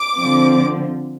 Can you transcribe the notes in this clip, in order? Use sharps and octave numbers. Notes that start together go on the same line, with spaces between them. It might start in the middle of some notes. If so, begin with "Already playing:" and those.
Already playing: D6
D3 F3 C4